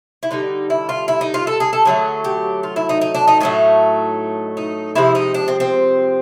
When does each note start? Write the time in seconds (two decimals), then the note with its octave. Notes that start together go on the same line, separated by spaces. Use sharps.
0.23 E4
0.31 D3 G3 D#4
0.70 E4
0.89 F4
1.08 E4
1.21 D#4
1.34 F4
1.47 A4
1.60 G#4
1.73 A4
1.85 D3 F#3 A3 G#4
2.24 G4
2.63 F4
2.76 E4
2.89 D#4
3.01 D#4
3.14 D4
3.27 D#4
3.41 A2 F#3 A3 D#4
4.57 D#4
4.95 C3 F3 G#3 E4
5.15 D#4
5.34 D4
5.48 C4
5.60 C4